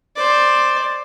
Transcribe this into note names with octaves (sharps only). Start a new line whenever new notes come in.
C5 D5